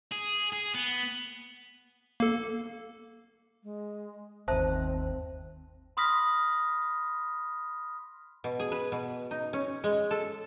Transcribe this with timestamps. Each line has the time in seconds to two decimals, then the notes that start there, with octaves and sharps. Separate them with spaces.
0.12 G#4
0.52 G#4
0.74 B3
2.20 A#3 A4
3.64 G#3
4.48 G1 D#2 C4 C5 E5 A5
5.97 B5 C6 D#6 F6 A#6 B6
8.44 B2
8.59 G#4
8.72 B4
8.92 B2
9.31 D#4
9.53 C#4
9.84 G#3
10.11 A4